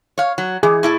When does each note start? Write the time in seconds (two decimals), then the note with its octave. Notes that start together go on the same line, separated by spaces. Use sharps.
0.18 C#5 F5
0.38 F#3
0.63 E3 G#4
0.83 A2 E4 A4